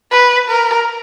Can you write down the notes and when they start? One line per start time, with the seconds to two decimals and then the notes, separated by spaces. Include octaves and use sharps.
0.11 B4
0.49 A#4